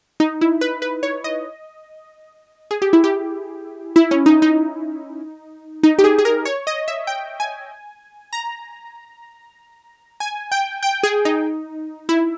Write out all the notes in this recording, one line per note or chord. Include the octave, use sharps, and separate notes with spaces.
D#4
E4
B4
B4
C#5
D#5
G#4
G4
E4
G4
E4
C#4
D#4
D#4
D#4
G4
G#4
G#4
A#4
C#5
D#5
E5
G5
G#5
A#5
G#5
G5
G5
G#4
D#4
E4